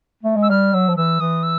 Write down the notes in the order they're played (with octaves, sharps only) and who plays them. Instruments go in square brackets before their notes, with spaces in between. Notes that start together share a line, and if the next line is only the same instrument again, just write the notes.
[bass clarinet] A3
G#3
[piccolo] E6
[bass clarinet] G3 [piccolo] F6
[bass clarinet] F#3 [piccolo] E6
[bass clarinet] F3
[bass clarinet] E3 [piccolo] E6
[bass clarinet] E3 [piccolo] D#6
[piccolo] E6